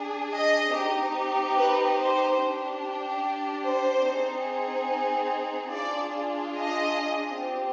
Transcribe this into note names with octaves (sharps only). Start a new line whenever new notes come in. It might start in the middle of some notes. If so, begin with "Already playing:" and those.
Already playing: D4 G#4
D#5
C4 D#4 G4
B4
C5
D4 G4
C5
C4 D#4 G#4
D4 F4 G#4 D5
D#5
C4 G4